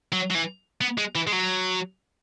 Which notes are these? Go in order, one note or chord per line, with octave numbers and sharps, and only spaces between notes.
F#3
F#3
E3
B3
G#3
E3
G#3
F#3